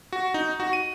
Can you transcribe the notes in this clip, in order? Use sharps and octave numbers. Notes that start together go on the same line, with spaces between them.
F#4
D#4
F#4
D#7